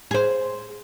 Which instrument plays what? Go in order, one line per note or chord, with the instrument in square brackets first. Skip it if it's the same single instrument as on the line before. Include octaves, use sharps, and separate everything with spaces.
[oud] G#4 C5